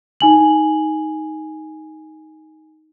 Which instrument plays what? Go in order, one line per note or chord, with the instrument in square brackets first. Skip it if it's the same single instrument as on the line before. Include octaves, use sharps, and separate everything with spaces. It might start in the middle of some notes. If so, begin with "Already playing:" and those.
[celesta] D#4 G#5 F#7